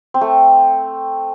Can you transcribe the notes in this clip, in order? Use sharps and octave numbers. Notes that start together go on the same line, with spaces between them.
C4
A3